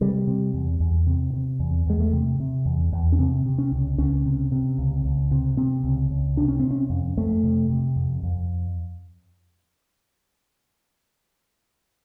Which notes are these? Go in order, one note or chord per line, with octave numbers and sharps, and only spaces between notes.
C3 G3
C3
E2
E2
C3
C3
E2
E2 G#3
A3
C3
C3
E2
E2
C#4
C3 C4
C3
C#4
C#2
C#2 C#4
C3
C3
C#2
C#2
C3
C3 C4
C#2
C#2
C3 D4
C#4
C3 C4
C#4
F2
F2 A3
C3
C3
F2
F2